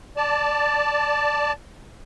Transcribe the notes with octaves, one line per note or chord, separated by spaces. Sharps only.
D5 A5